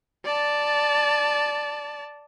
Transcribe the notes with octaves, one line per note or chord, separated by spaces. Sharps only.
D5 A5